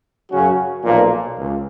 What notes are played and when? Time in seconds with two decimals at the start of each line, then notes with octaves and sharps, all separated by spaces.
0.29 F#2 C#3 F#3 C#4 F#4
0.84 B1 A#2 F3 A#3
1.38 C#2